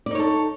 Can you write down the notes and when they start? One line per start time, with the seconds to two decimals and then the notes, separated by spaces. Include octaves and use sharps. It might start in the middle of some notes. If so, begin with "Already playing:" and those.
0.06 D5
0.11 D#4
0.15 C#5
0.19 A4